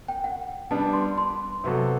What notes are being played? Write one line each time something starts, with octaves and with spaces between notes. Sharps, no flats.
G5
F#5
G3 B3 D4 A5
C6
C6
C3 F#3 B3 F#4 A4